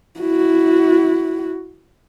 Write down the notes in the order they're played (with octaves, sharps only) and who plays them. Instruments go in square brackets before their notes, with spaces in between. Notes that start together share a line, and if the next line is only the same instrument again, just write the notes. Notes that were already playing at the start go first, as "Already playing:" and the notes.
[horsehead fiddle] E4 F#4